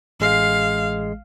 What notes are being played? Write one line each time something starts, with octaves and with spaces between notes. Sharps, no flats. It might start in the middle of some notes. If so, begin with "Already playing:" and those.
A1 G#3 F5 C7